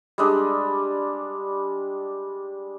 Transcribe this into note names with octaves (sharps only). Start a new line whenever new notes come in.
G3 G#3 D4